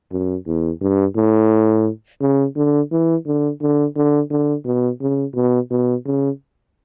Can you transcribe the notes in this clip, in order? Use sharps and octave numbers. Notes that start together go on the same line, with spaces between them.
F#2
E2
G2
A2
C#3
D3
E3
D3
D3
D3
D3
B2
C#3
B2
B2
C#3